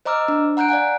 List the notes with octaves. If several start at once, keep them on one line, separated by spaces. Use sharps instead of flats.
C5 D#5 A#5 D6 E6 F6
D4
F#5 A#5 F#6 G6 D7
D5 F5 F#5 G#5